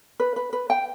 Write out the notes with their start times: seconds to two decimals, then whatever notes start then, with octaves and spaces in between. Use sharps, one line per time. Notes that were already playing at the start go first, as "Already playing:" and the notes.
0.20 B4
0.36 B4
0.53 B4
0.70 G5